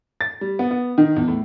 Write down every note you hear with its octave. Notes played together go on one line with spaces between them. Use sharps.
A6
G3
B3
B3
D#3
E2
A2